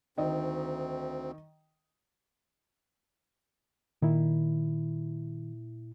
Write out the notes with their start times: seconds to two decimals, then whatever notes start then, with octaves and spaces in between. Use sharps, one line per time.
0.18 D2 D#3 C4 D#5
4.02 A#2 D#3 E4